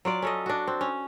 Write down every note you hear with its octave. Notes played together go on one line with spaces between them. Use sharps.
F#3 F4 D5
C#4 A4 D#5
D4 F#4
C4
C#4